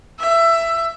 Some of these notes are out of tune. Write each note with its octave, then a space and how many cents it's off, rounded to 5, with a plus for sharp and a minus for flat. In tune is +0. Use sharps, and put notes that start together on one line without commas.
E5 +15